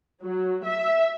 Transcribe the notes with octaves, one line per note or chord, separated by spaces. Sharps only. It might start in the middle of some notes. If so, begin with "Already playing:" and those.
F#3
E5